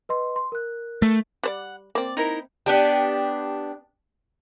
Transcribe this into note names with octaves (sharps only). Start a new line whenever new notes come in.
B4 D#5 C6
C6
A#4 F#6
A3
G3 C5 D5 F#5
A#3 C4 D5
D#4 E4 A#4
B3 D4 G4